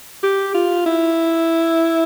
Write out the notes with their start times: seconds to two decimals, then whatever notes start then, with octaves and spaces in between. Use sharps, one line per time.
0.23 G4
0.55 F4
0.86 E4